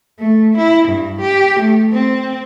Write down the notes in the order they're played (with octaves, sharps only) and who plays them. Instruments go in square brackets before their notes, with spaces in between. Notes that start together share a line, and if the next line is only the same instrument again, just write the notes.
[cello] A3
E4
G2
G4
A3
C4